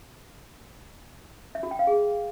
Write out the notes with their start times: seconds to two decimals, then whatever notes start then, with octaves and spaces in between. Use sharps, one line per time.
1.55 E5
1.63 F#4
1.71 G5
1.79 F5
1.87 G#4